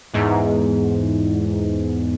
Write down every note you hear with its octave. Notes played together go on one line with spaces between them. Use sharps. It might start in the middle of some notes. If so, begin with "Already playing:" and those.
E2 G#2